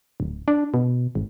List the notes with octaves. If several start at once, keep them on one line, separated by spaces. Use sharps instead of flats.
D1
D4
B2
G#1